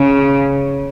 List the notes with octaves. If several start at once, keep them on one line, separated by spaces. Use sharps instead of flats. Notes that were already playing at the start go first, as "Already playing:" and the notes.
Already playing: C#3